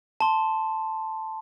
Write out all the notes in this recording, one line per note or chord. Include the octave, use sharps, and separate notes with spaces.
A5 C6